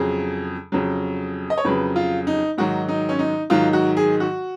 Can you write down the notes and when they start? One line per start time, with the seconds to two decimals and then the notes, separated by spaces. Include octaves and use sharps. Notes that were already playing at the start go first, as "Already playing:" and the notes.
Already playing: F2 C#3 F#3 G#4
0.72 F2 C#3 F#3
1.50 D#5
1.58 C#5
1.65 F2 C#3 F#3 B4
1.96 F4
2.27 D#4
2.58 G#2 D#3 F#3 F#4
2.88 D#4
3.09 C#4
3.19 D#4
3.50 G#2 D#3 F#3 F4
3.73 F#4
3.97 G#4
4.20 F#4